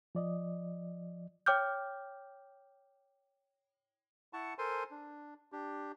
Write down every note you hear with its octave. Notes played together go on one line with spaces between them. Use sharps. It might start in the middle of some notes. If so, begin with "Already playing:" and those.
F3 D5 D#5
C#5 G5 D6 F6 G6
E4 F#5 A5 C#6
A4 A#4 C5 G#5 C6
D4
D4 G4